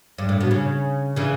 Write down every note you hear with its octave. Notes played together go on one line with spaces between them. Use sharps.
G2
A2
B2
C#3
C#3 E3